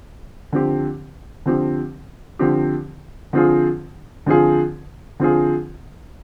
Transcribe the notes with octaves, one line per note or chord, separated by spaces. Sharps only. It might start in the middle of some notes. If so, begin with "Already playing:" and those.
D3 F3 C4 G4
D3 F3 C4 G4
D3 F3 C4 G4
D3 F3 C4 F4 G#4
D3 F3 C4 F4 G#4
D3 F3 C4 F4 G#4